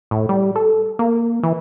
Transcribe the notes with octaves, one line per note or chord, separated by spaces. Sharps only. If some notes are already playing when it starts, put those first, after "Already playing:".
A2
G3
A4
A#3
E3